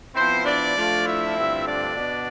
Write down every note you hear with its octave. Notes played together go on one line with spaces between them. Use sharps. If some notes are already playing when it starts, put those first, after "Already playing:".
F3 B3 C4 E4 C5
D4 D5
F3 A3 D4 F4
E4 E5
G2 D3 A3 C4 F4
D4 D5
B2 B3